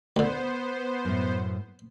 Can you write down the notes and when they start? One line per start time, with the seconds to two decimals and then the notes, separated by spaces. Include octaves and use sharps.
0.16 D2 D3 B3 C5
1.05 F#2 A2